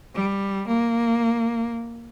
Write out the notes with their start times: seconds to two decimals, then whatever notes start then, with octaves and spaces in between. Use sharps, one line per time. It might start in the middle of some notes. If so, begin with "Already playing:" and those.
0.14 G3
0.68 A#3